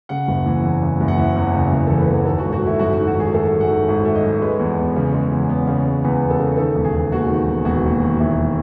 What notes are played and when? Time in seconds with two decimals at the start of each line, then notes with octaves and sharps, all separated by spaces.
0.09 C#3 F#5
0.28 F#1
0.46 E3
0.63 E2
0.82 C#3
1.00 F#1
1.08 F#5
1.18 E3 E5
1.36 E2
1.54 C#3
1.72 F#1
1.87 E3 A4
1.99 B4
2.08 E2
2.25 D#3 A4
2.39 F#4
2.44 G#1
2.53 F#4
2.62 A3 E4
2.79 F#2 F#4
2.93 D#3 F#4
3.07 F#4
3.16 G#1 G#4
3.34 A3 A4
3.52 F#2
3.61 F#5
3.70 D#3
3.88 G#1
4.05 A3 E5
4.15 D#5
4.23 F#2
4.42 G#3 B4
4.59 E2
4.78 B3
4.96 C#3
5.14 G#3
5.32 E2
5.49 B3
5.67 C#3
5.86 G#3
6.04 E2 B4
6.21 B3
6.30 A4
6.39 C#3
6.57 D#3 A4
6.75 E1
6.85 G#4
6.94 E1
7.12 D#2 F#4
7.29 D#3
7.48 E1
7.65 E1 F#4
7.84 D#2
8.01 D#3
8.19 E1 E4